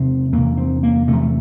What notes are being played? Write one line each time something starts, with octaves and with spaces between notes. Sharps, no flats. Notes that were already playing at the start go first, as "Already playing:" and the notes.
Already playing: E2 C3 C4
E2 C3 A#3
C4
A#3
E2 C3 A3